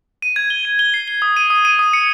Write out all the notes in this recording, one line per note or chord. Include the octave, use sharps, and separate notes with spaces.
D#7
G#6
G7
D#7
G7
C7
G7
D#6
D#7
D#6
D#7
D#6
C#7